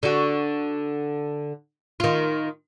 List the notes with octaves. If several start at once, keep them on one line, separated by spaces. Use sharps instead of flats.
D3 F#4
D#3 F4